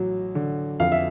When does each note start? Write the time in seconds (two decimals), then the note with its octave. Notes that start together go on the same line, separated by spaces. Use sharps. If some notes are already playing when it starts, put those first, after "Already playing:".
Already playing: A1 F#3
0.35 D3
0.80 F2 F5
0.92 E5